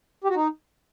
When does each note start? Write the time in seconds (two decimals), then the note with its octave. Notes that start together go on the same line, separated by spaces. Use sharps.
0.24 G4
0.30 F#4
0.35 D#4